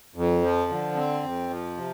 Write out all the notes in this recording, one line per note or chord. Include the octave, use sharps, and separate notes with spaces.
F2
F3
D3
C4
F2
F3
C3